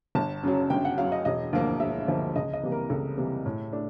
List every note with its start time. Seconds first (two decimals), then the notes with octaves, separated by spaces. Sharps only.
0.15 G1 A5
0.43 F#2 C#3 F#3
0.70 G1 G5
0.85 F#5
0.97 F#2 C#3 F#3 F5
1.12 D#5
1.25 E1 D#5
1.53 D2 D3 F3 A#3
1.80 E1 E5
2.07 D2 D3 F3 A#3
2.36 C#2 D#5
2.53 D#5
2.63 C3 E3 G3 A#3
2.72 A#4
2.90 C#2 A4
3.17 C3 E3 G3 A#3
3.46 A2
3.73 A3 D4